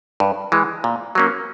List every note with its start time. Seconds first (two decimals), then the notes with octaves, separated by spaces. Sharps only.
0.20 G2
0.52 E3 G#3
0.84 A#2
1.15 F#3 A#3 C#4